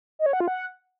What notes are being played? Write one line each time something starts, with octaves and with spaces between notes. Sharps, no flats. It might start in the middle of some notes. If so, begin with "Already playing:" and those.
D#5
C#5
F#5
F4
F#5